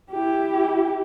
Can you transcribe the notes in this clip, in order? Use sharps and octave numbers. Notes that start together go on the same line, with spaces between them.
E4 G4